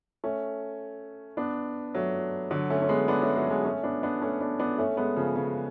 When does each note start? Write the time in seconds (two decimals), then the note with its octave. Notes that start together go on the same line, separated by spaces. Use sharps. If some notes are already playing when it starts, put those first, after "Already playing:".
0.24 A3 C#4
1.37 B3 D4
1.94 F#3 A3
2.51 D3 F#3
2.70 A3 C#4
2.82 C#4
2.89 G#3 B3
3.08 B3 D4
3.22 A3 C#4
3.36 F#3 A3
3.50 G#3 B3
3.65 A3 C#4
3.83 B3 D4
4.03 B3 D4
4.21 A3 C#4
4.41 B3 D4
4.59 B3 D4
4.78 A3 C#4
4.97 G#3 B3
5.16 C#3 F3
5.36 C#3